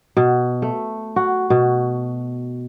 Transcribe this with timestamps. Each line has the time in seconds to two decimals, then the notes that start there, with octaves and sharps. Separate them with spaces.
0.17 B2
0.62 A3
1.16 F#4
1.50 B2